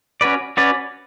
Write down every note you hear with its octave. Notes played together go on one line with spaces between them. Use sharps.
C#4 F#4 B4 D5
C#4 F#4 B4 D5